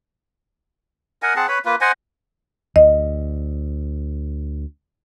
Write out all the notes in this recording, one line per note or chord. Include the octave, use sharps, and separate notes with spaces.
A#4 D#5 F#5 G#5
C4 G#4 F#5 A5
B4 C#5 B5
A#3 F4 B4
C5 D#5 F#5 G#5
D2 D#5